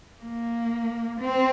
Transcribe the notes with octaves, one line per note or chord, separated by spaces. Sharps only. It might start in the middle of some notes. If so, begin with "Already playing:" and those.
A#3
C4